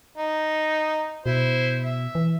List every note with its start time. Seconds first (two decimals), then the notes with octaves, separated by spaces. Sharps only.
0.18 D#4
1.26 B2 E4 C5
1.83 E5
2.15 E3